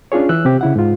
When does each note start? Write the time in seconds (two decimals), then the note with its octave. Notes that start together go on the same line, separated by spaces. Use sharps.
0.12 C#4 D4 F4 G#4 C#5
0.29 E3 E6 F#6
0.45 C3 C4 G4
0.61 C#3 E4 F#5
0.76 G#2 F4